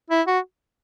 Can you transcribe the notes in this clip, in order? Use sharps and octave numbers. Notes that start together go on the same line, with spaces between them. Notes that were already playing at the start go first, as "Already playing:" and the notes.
E4
F#4